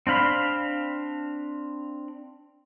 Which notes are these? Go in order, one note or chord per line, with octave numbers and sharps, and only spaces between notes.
C4 D4 F5 B5 C6